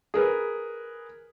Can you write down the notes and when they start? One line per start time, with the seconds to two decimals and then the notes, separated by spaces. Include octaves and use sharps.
0.14 G#4 A#4 B4